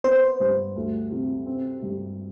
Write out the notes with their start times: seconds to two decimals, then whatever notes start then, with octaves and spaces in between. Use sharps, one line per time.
0.04 B3 C5
0.40 G2
0.76 D2
1.11 C3
1.46 C4
1.82 G2